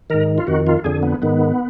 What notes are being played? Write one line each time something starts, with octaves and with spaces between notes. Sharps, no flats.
G#2 D#3 A#4
F4
F2 D#3 F#4
F4
F2 D3 G#4
B3
G#2 D#3 B3